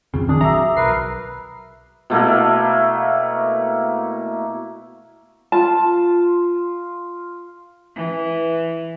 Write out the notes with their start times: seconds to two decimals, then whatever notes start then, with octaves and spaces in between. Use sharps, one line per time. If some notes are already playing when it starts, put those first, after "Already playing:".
0.14 A#1 F2 C#3 C4
0.29 D#3 D4 G#4
0.41 F#3 E5 A#5 D6 E6
0.77 B1 A#4 B4 C7
2.10 B2 A3 A#3 E4
5.52 F4 A5
7.95 E3